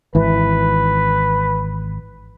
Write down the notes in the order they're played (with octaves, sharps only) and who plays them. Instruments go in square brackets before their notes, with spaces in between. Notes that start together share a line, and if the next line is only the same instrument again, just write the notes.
[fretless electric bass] G#1 E3 [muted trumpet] B4